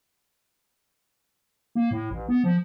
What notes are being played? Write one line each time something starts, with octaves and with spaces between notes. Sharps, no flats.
A#3
A2
A1
B3
F3